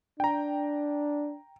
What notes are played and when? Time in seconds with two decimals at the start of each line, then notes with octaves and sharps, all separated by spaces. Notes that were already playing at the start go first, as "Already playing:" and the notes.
0.20 D4 G5 A#5